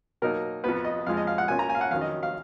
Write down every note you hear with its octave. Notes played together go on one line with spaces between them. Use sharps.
B2 F#3 A#3 D#4 A#4
F2 F3 B3 B4
D#5
F2 F3 G#3 F5
D#5
F5
F#5
B2 A#3 C#4 F4 G#5
A#5
G#5
F5
F#5
F2 D#3 F#3 C#4 F5
D#5
F5